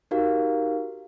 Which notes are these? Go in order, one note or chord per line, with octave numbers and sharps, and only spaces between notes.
D#4 F#4 G4 A#4 F5